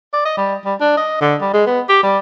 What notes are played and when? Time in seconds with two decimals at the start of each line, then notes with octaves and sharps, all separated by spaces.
0.13 D5
0.25 D#5
0.37 G3
0.65 G3
0.80 D4
0.97 D#5
1.21 D3
1.41 G3
1.53 G#3
1.66 B3
1.89 G4
2.03 G3